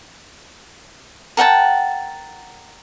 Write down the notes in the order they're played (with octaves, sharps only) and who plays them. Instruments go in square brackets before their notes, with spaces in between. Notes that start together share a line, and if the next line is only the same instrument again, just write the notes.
[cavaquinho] A#4 F#5 G5 A5